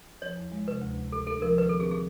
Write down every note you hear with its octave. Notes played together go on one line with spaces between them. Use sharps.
F3 C#5
E2
G#3
C3 B4
D2
D2
A3 A4
D4 A4
F3 A#4
D#3 B4
C4 A4
G#4
G#4